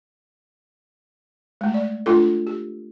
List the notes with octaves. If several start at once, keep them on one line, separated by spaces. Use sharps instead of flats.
G#3 A3
D5
A3 D4 F4 A4
G4